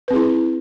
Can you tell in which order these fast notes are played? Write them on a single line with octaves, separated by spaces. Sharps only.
B4 C4 G#4 E4